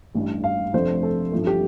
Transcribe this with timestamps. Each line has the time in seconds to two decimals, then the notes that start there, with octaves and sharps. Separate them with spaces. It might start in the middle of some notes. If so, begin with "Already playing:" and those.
0.15 A1 G2 G3
0.44 F5
0.73 F1 F2 F3 A3 D4 C5
1.03 A4
1.32 A1 G2 F3 A3
1.47 G4